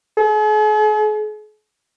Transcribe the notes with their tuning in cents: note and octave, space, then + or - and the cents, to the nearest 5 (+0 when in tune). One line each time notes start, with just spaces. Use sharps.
G#4 +45